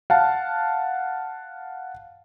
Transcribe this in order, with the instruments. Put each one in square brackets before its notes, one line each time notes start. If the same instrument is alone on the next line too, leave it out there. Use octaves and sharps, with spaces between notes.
[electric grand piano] F5 F#5 A5